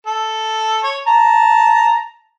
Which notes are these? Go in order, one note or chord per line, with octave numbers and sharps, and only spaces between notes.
A4
C#5
A5 A#5